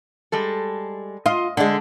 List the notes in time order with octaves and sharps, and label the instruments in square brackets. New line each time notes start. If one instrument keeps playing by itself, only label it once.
[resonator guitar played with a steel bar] G3 G#3 A4
[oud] F4 [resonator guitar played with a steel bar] D#5
[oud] D3 G#3 [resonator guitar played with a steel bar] D4